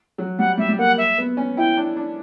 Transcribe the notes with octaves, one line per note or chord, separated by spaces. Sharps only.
F#3
G3 F#5
G3 E5
G3
A#3 F#5
E5
B3
C#4
E4 G5
D4
D4